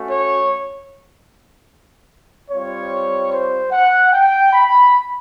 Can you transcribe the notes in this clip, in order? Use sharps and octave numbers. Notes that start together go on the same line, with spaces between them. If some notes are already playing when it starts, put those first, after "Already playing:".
Already playing: A3 C#4 F#4
C#5
G3 C4 F4 C#5
C5
F#5
G5
B5